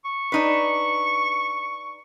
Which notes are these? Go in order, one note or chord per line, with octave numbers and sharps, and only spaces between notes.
C#6
D4 D#4 B4